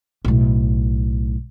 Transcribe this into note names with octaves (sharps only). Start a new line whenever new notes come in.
B1 A2